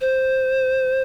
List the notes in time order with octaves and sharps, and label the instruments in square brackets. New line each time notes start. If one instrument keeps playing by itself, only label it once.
[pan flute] C5